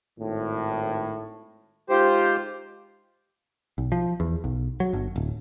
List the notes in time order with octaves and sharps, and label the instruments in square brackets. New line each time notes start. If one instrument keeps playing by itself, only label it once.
[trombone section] G#1 A2
[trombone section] G#3 D#4 F4 [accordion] G4 C5
[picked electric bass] B1
F3
E2
B1
F#3
G1
D1